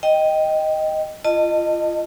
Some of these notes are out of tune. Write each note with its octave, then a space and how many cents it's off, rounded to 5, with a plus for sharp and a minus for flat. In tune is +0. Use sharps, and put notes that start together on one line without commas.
D#5 +0 G5 +0
F4 -25 D#5 -20 A5 +25